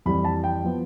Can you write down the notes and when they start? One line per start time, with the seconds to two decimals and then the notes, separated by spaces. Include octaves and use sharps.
0.05 F2 E3 G3 B5
0.24 A5
0.44 G5
0.64 F3 B3